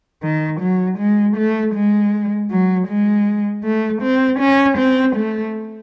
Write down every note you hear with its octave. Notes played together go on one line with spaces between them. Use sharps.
D#3
F#3
G#3
A3
G#3
F#3
G#3
A3
C4
C#4
C4
A3